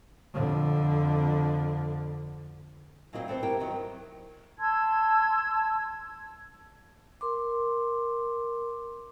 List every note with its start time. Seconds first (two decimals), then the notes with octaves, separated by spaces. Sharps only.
0.34 F2 D3
3.13 A#2 F#3 C4 E4 D5 G5
3.28 B3 C4 A4 C5
3.43 C3 E4 G4 A#4 G5
3.59 E2 D#3 F#3 B3
4.58 A5 C6 E6 G#6
7.21 A#4 C6 D6